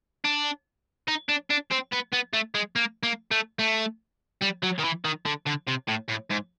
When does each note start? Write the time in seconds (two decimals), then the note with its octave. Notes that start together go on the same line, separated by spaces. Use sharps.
0.25 D4
1.08 D#4
1.29 D4
1.50 D4
1.71 C4
1.92 B3
2.12 B3
2.33 A3
2.55 G#3
2.76 A#3
3.03 A#3
3.31 A3
3.59 A3
4.42 G3
4.63 F#3
4.79 D#3
4.84 E3
5.05 D#3
5.26 D3
5.47 D3
5.68 C3
5.88 A2
6.09 A2
6.31 G#2